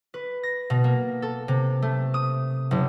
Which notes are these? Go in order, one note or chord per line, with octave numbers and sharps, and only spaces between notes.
B4
A#6
B2
A#3
A4
C3
A3
D#6
F#1